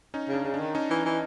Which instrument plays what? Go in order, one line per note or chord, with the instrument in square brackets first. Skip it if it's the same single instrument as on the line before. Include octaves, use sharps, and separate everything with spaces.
[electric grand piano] C#4 D#4
[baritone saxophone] C#3
[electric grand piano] D4
[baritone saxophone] C#3
[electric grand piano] D4
[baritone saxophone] D#3
[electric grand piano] C#4 D#4
[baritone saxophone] E3
E3